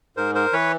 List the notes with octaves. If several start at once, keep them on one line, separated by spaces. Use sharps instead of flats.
G#2 A#4 C5
A#4 C5
E3 B4 C#5